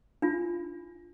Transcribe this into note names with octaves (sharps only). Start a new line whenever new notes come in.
D4 F4